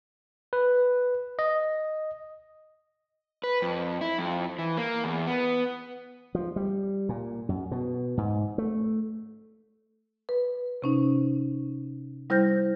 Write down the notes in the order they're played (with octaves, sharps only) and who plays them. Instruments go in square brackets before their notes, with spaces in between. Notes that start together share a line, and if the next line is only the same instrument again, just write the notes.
[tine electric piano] B4
D#5
[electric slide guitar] B4
F2
E4
F2
E3
A#3
E2
B3
[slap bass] F3
G3
A#2
F#2
B2
G#2
A3
[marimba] B4
C3 C#4 D#4
G3 E4 C5 F6 G6 A#6